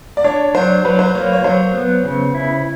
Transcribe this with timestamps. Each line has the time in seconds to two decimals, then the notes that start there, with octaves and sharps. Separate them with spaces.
0.17 D5
0.24 D4 C#5
0.54 F#3 C5
0.84 F#3 B4
0.99 C5
1.15 A#3 C#5
1.33 C#5
1.44 F#3 C5
1.74 B3
2.05 C#3
2.35 E4